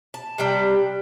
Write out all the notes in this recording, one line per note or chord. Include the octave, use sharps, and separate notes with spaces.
A5
C3 G3 D4 G5